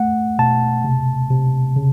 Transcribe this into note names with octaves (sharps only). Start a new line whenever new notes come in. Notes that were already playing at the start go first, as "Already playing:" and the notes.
Already playing: A3 F#5
B2 A5
C3
C3
C#3